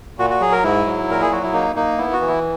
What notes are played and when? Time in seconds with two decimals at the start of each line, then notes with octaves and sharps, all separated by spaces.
0.18 A#2 F#4
0.30 F#4
0.41 F#3 G#4
0.52 A#4
0.63 G#2 E4
0.86 F#3
1.09 A#2 A#4
1.22 G#4
1.31 F#3 F#4
1.42 E4
1.53 A#3 D#4
1.76 A#3 D#4
1.98 B3 E4
2.13 F#4
2.21 E3
2.28 E4